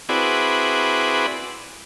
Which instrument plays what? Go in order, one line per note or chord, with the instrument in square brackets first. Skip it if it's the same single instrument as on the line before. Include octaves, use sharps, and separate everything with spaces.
[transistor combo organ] C4 E4 F#4 G#4 B4 D5